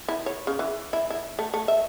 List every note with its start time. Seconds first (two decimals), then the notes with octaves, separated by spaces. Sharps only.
0.08 E4
0.26 C#5
0.47 C#3
0.59 E3
0.93 E4
1.10 E4
1.39 A3
1.54 A3
1.68 E5